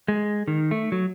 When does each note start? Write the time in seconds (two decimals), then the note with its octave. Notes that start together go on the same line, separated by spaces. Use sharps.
0.08 G#3
0.48 D#3
0.71 A3
0.92 F#3